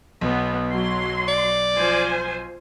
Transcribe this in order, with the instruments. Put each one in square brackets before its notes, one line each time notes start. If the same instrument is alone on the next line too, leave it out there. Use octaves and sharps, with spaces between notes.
[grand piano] B1 [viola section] B3
[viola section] F#3 C6
[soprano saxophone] D5
[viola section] F3 C5 G#5